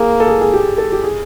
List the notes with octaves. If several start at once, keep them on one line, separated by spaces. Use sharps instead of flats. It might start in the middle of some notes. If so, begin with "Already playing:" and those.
Already playing: A#3 G#4
A4
G#4
G#4
G4
A4
G4
G#4